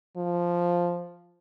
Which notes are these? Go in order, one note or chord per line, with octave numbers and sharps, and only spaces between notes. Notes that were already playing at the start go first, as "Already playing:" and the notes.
F3